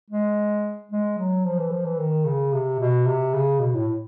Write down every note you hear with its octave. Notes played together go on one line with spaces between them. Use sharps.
G#3
G#3
F#3
F3
E3
F3
E3
D#3
C#3
C3
B2
C3
C#3
B2
A2